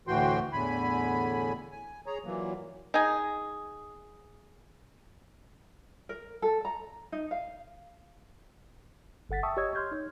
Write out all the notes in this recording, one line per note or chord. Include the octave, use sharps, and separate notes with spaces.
D2 A2 E3 F#4 G5 C6
E2 A2 D3 G#5 B5
G#5
G#4 C#5 A#5
A#2 E3 F#3 A#3
D#4 G#4
A#4
A4
A#5
D#4
F5
G1 A4 F#5 A6 B6
E5 G5 A5 C#6 D#6 E6
G4 C#5 D#5 C#6 E6 G#6
C6 F6 G6 G#6
D#4 C#5